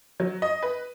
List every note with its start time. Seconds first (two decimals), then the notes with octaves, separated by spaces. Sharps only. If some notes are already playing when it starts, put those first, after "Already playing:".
0.20 F#3
0.42 D#5
0.63 B4